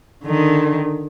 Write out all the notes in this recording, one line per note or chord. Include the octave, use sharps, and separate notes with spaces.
D3 D#3